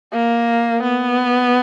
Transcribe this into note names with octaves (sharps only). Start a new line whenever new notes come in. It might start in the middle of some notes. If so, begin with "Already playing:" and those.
A#3
B3